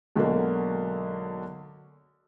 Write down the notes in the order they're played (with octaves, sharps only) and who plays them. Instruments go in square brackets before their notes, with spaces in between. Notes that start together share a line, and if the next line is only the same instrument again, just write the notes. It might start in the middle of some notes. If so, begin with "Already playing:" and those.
[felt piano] B1 D3 F#3 G#3 A#3